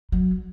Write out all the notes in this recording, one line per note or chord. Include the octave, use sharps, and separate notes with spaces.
F#3